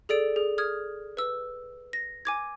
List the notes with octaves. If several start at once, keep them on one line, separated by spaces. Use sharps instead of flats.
G#4 A4 D5 D7
G#4
D#6 F6 G#6
B4 E6
A#6
G#5 D6 G#6